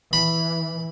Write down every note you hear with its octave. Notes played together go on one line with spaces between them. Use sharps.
E3 B5